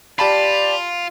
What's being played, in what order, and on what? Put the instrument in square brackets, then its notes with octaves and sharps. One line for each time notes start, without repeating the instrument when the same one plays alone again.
[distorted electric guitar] F4 [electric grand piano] G4 A5 B5 [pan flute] D5